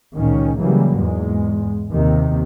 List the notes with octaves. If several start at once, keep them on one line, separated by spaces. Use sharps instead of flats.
C#2 A#2 D#3 C#4
C#3 E3 F#3 G3 A#3
E2 G#2 G#3
D#2 C3 D#3